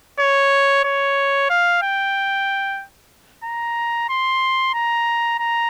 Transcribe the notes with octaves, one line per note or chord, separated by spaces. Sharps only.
C#5
C#5
F5
G5
A#5
C6
A#5
A#5